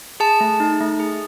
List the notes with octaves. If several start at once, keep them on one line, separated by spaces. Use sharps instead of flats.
G#4 A5
A3
D#4
A3
G#4